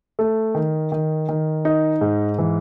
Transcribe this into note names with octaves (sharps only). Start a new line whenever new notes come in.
A3
D#3
D#3
D#3
D#4
G#2
E3